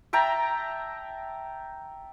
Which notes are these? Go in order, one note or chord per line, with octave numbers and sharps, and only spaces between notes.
E5 G5 A5 A#5